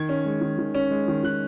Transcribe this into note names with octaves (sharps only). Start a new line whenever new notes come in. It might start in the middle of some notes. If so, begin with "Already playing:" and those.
Already playing: D#3 G#6
C#4
G#3
D#3
D#3
C#4
G#3
D#3
D#3 F#6